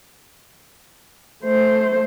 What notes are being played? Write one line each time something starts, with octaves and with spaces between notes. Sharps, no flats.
A3 C5